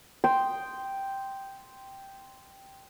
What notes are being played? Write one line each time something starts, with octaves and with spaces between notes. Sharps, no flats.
G5 C6 D#6